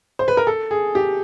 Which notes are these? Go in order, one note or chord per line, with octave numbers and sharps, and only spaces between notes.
C5
B4
A#4
A4
G#4
G4